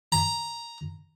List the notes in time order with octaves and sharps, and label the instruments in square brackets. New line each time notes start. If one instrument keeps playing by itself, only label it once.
[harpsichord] A#5